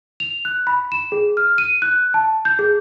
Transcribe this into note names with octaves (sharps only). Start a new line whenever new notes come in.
F7
F#6
B5
E7
G#4
F6
D#7
F#6
A5
G6
G#4